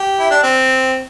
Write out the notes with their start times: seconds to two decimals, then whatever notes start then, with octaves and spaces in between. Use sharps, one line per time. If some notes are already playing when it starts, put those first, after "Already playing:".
Already playing: G4
0.19 E4
0.31 D4
0.43 C4